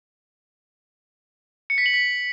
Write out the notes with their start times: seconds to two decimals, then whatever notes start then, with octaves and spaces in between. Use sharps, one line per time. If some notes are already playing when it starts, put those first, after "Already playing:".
1.70 C#7
1.78 B6
1.86 F#7
1.94 B6